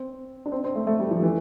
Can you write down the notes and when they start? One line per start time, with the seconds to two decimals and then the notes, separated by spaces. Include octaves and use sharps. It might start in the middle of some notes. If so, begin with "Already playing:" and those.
Already playing: C4
0.46 D4
0.52 C4
0.64 C4
0.75 A3
0.87 A3
1.00 G3
1.11 F3
1.23 E3